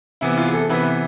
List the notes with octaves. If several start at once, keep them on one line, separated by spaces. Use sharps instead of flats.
C3 E3 B3 E4
F4
G#4
A4
C3 E3 B3 B4